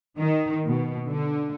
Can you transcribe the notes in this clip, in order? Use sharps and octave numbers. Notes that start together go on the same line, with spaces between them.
D#3
B2
D3